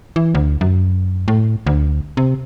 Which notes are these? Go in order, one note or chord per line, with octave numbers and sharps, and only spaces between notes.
E3
D2
F#2
A2
D2
C3